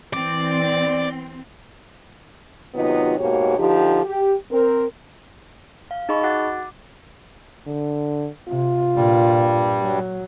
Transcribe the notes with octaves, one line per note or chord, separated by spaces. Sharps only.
E3 C4 D5
D#2 C3 F#3 B3 D#4 F4
G#2 B2 A#3 F#4 G4 C#5
D3 F3 D#4 G4
G4
C4 A#4
F5
D#4 G#4 D#5 B5 C#6
F#4 F#5 D6 F#6 A6
D6
D3
C3 F4
G2 A#2 G3
F#3